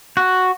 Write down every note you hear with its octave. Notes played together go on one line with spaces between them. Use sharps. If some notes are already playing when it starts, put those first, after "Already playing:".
F#4